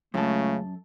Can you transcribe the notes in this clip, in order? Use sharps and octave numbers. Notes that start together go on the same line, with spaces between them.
C#2 F#2 C#3 A3 A4